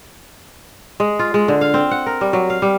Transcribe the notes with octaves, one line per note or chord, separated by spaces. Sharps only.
G#3
F4
G#3
D3
F5
C4
F#5
A#4
G3
F#3
F5
G3